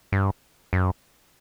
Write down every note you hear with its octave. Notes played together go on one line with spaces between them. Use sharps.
G2
F#2